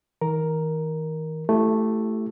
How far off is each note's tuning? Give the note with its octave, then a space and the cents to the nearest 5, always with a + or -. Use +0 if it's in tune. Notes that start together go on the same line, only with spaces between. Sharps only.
D#3 +45 A#4 +5
A3 +0 E4 +35 G4 +0